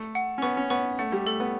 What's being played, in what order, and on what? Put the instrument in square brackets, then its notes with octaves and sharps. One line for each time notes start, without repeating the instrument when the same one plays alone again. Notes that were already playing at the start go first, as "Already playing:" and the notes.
Already playing: [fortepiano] A3
[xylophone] F#5
[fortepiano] C#4
[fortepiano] B3 [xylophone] C#6
[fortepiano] C#4
[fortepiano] B3 [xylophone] C#6
[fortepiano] A3 [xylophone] F#5
[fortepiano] G3
[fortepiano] A3 [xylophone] A4
[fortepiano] B3